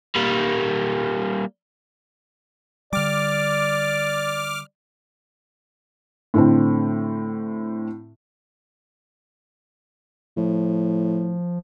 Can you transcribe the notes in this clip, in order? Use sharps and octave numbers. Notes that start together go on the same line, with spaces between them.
G3 A#3
D3 G3 D5 D6 F6
A2 D3 C4
A2 F3